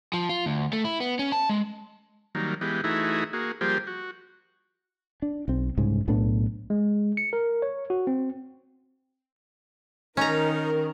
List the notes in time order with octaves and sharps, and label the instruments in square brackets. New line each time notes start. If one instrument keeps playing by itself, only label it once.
[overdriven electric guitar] F3
F4
D2
A3
E4
B3
C#4
A5
G#3
[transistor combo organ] D#3 F#3 G3 A#3
E3 G#3 B3 G4
E3 A3 D#4 E4 F#4 G#4
A#3 F#4 G#4
F3 G3 A#3 G4 G#4 C5
F#4
[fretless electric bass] D4
B1 C4
C2 G#2 C#3 G#3
B1 A2 B3 D4
[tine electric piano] G#3
C#7
A#4
C#5
F#4
C4
[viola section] D#3 A#4 [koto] C#4 A#5 [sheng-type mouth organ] D#4